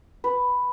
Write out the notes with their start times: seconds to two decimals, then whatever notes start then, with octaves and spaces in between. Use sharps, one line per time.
0.24 B4